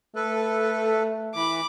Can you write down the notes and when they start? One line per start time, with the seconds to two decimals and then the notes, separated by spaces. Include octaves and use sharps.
0.16 A3 A4 B4
1.35 E3 B5 D6